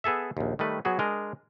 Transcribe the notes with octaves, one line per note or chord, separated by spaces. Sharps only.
B3 G#4 A4 E5
A#1 D#2
D#3 G3 A3 B4
F#3 B3 F#4 G#4
G#3 D4 A#4 D#5